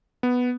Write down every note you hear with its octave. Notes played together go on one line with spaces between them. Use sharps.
B3